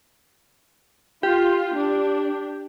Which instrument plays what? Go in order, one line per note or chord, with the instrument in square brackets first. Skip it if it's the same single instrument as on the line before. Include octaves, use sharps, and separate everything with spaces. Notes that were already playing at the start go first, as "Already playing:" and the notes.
[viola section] F4 [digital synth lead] G4
[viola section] D4